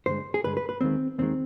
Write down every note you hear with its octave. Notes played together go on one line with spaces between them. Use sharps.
G2 D3 G#3 C5
G#4
G2 D3 G#3 B4
B4
B4
D#2 D#3 G#3 C4
D#2 D#3 G#3 C4